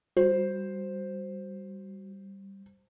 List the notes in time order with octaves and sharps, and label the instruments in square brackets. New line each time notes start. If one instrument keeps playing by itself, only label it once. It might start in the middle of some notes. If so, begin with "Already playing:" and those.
[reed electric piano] G3 [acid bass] F#4 [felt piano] C5